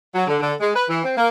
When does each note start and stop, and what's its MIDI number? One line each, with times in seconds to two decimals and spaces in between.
0.15 0.24 54
0.27 0.38 50
0.40 0.53 50
0.60 0.71 56
0.74 0.83 71
0.89 1.03 52
1.04 1.14 60
1.17 1.28 58